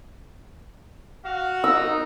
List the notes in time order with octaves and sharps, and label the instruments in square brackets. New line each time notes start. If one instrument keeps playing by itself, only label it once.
[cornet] F#4 [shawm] F5
[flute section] D#4 [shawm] A#4 [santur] E6